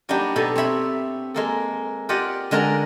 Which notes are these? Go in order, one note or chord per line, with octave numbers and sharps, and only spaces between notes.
F#3 G3 A#3 D4 D#4 G4
B2 G4 A4 B5
C4 C#5 E5 B5
G#3 A#3 A4
F4 G4 D5 D#5 F#5
D3 G#3 A#4 D5 A#5